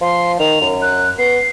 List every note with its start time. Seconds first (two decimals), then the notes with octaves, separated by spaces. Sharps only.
0.01 F3 C6
0.40 D#3 F7
0.61 F#2
0.82 F#6
1.18 B3 C7